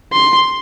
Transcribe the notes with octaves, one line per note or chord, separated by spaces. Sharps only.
C6